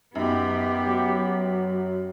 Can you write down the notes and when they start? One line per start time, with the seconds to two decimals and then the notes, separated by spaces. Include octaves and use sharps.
0.15 F#2 B3 D#4 G4
0.85 F#3